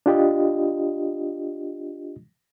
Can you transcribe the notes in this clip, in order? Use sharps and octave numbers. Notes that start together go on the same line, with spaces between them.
D4 F4 G4 D#5